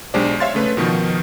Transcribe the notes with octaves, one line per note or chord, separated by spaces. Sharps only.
B1 G#3 D4 G4 C5 D5
C#5 E5 F5 C6 A6
C#3 A3 B4
B2 D#3 F3 D#4